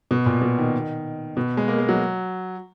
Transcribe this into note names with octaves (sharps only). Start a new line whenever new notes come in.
B2
A#2
B2
D#3
B2
G#3
A#3
G#3
F#3